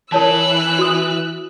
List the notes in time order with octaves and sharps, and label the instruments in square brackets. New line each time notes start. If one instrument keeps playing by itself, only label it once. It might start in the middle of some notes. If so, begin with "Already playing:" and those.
[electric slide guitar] E3 [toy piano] A#4 C#5 A5 [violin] E6 F#6
[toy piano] F#4 D#6